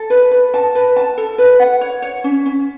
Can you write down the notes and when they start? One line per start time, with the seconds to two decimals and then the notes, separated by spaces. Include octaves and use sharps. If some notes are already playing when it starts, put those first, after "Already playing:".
Already playing: A4
0.10 B4
0.31 B4
0.54 A5
0.75 B4
0.96 A5
1.18 A4
1.38 B4
1.59 F#5
1.81 C#5
2.02 C#5
2.24 C#4
2.46 C#4